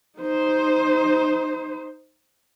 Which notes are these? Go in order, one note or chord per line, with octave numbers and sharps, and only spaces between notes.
D#4 C5